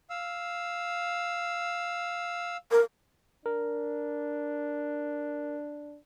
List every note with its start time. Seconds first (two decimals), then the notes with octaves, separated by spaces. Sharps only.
0.10 F5 E6
2.71 A#4
3.46 D4 A#4